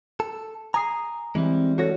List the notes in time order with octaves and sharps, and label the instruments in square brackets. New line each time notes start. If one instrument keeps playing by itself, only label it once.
[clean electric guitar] A4
[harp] G#5 D#6 C7 [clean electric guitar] A#5
[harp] E3 [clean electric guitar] G3 G#3 [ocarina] C4
[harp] F#4 C#5 A#6 [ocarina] A4